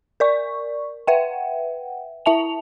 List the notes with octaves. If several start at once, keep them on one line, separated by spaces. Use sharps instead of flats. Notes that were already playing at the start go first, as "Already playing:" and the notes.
A#4 D5 C#6
B4 E5 F#5 G5
E4 E5 A5 F7